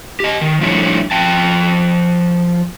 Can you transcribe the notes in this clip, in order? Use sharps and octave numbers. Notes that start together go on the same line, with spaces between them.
G4 D#5
D#3
F3 G3 A3 D4 E4 C#5
F3 G5 A5